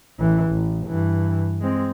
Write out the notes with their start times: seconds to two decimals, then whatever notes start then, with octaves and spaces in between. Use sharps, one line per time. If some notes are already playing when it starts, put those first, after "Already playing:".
0.19 A1 E3
0.51 A1
0.86 G2 E3
1.61 G#3 C4